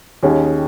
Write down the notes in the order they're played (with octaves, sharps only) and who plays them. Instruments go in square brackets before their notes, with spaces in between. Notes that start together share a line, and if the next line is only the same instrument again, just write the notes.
[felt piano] D#2 D#3 C#4 G#4